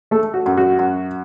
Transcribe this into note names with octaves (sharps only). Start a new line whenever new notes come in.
A3 A4
F#4
F#2
F#4
F#2